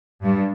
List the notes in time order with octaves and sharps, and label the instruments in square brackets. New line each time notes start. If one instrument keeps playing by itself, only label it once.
[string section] G2